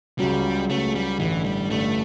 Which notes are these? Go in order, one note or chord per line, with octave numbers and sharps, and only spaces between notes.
C#2 C#3 F#3 G3 C#4
C#2 C#3 F#3 A3 C#4
G3
A1 G2 D3 E3
G3
A1 G2 D3 A3